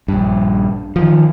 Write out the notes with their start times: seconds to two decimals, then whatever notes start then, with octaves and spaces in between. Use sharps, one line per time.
0.08 A#1 G2
0.96 D#3 F3